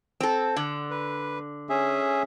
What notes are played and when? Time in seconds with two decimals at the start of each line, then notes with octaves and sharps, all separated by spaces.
0.20 C4 A4
0.56 D3
0.91 B4
1.69 C#4 G#4 E5